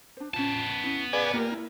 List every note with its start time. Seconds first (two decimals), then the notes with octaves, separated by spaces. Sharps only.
0.17 D4 C5
0.34 B3 C#4 F4 A5
0.84 C#4 E4
1.13 G#4 B4 D5 F5 G#5
1.34 A#3 F4 G4 A#4
1.52 E4